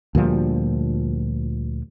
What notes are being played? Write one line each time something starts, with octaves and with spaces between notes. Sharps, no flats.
D2 A#2 F3 G3